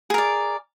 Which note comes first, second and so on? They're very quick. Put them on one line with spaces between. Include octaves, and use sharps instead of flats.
G#4 A#4 D5